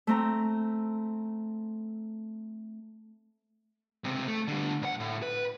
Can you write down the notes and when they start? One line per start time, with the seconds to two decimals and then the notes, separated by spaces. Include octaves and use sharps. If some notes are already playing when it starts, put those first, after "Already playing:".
0.07 A3 C4 A#5
4.04 C#2 C3
4.27 A3
4.48 D3 G3
4.82 B1 F#5
5.00 A2
5.23 B4